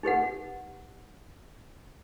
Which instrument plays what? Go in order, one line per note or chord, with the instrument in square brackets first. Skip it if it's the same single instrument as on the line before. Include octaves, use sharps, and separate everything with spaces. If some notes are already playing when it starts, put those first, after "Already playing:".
[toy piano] D#4 G4 B4 F#5